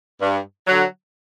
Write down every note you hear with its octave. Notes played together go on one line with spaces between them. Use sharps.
G2
D3 F#3